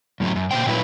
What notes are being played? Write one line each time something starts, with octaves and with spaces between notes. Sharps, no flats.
F#2 A2 F#3
F#2
A#2 F3 C5 G5
A#2 F#3 E4 B4